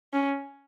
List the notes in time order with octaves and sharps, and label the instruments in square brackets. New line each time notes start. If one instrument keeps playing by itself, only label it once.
[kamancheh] C#4